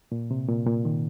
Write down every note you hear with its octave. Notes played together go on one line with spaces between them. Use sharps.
A#2
C3
A#2
A#2
D#3